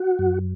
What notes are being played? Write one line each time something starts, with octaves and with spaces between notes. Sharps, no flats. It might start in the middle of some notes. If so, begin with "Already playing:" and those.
Already playing: F#4
F#2